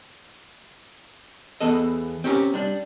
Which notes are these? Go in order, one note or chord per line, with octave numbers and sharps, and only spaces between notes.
E2 B3 A4 D#5
C4 C#4 G4 A#4
G3 D4